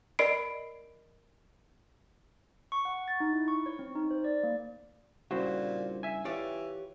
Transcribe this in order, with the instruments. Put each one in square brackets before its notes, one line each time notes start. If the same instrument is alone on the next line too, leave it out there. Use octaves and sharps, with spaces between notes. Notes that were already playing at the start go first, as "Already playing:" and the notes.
[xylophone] A#4 D5 D#5 B5 C7 D7
[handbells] C#6
F#5
A6
D#4
E4
C#6
C#5
C4
D#4
C5
D5
A#3
[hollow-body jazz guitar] G2 C#3 E4 [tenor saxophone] A#2 [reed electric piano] F#4 C5
[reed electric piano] E5 G#5
[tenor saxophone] E3 [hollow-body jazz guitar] F4 G4 D5 [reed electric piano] C#5